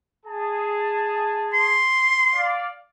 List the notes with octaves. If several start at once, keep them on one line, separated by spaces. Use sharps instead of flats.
G#4 A5
C6
D5 F5